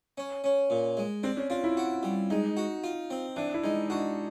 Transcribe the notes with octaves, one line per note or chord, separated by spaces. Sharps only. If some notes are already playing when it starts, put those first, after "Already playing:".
C#4
C#4
A#2
G#3
C4 D4
C#4
D4 F4
E4
F#4
G3
G#3 D#4
F#4
F4
C4
E3 D4
E4
G#3 D#4
D4 F#4